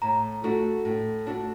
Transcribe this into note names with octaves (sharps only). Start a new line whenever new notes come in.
A2 A#5
A3 D4 F#4
A2
A3 D4 F#4